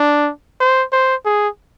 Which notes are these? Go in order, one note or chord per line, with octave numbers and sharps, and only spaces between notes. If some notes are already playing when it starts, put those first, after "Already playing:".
Already playing: D4
C5
C5
G#4